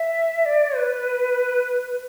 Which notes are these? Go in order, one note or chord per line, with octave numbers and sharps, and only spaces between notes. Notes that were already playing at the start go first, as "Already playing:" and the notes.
Already playing: E5
D5
B4